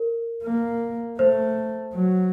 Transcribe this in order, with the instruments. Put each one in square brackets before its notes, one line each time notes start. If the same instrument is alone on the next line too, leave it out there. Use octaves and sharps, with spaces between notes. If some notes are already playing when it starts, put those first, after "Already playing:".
Already playing: [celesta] A#4
[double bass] A#3
[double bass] A3 [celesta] C5
[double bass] F#3